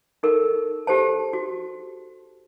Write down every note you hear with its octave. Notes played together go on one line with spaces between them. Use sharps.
D#4 A4 A#4
G4 A4 C5 A5
F#4